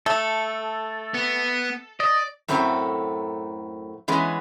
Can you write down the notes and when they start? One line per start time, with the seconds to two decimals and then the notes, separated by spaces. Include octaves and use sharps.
0.06 A3 A4
1.14 B3
2.00 D5 D#5
2.48 F#2 A2 A3 C4 F4 F#4
4.08 E3 G#3 B3 C#4